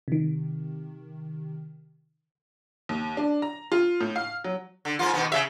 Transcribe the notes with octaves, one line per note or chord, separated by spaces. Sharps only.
C3 D#3
D#2
D4
A#5
F4
A2
F5
F#3
D3
G#2 A#3 F4
B2 D#3 B3
C#3 E5